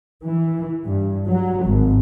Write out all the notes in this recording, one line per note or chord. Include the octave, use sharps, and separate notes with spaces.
E3
G2
F#3
G#1